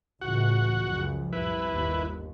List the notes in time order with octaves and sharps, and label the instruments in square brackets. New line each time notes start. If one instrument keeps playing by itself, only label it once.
[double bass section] C#2 A2 E3 [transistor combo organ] F#4 F#5
[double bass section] C#2 F#2 F3
[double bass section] C2 [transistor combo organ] E4 B4
[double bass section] G1 D#2